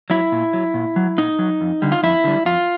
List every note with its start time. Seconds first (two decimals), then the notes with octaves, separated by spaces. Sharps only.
0.10 F#3 E4
0.32 A#2
0.53 F#3
0.74 A#2
0.96 F#3
1.18 A#2 D#4
1.39 F#3
1.61 F2
1.82 D3 G3
1.92 F4
2.03 F2 E4
2.24 D3 G3
2.45 F2 F4